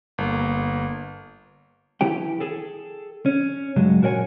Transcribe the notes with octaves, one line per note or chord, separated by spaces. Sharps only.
G1 A#3
E3 E4 G4 G5
G#4 A4
C#4
G2 C#3 F#3 G#3
A#2 F#4 A#4 C#5 D5 G#5